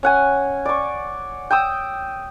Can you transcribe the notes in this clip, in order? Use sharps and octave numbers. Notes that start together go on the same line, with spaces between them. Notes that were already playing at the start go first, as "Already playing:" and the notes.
C#4 F#5 G#5
D5 C#6
G5 D#6 E6